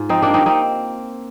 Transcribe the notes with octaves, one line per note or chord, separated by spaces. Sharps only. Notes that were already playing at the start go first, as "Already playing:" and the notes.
Already playing: G#2 F4
F3 C4 D#4
G2 A#3 D4
C4 D#4
C4 D#4